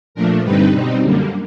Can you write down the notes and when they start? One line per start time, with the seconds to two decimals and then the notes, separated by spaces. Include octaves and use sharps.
0.15 A#2 F3 A3 D4 A#4
0.43 G2 D3 G3 C4 D#4 B4
0.72 B2 G3 C4 D#4
1.01 F#2 D3 G3 A#3